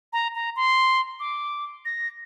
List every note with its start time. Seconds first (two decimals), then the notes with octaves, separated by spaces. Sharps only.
0.13 A#5
0.35 A#5
0.56 C6
1.20 D6
1.85 A#6